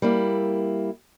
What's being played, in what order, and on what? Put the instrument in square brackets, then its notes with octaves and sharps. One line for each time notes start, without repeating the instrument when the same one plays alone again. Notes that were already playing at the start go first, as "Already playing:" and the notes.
[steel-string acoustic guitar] G3 A#3 E4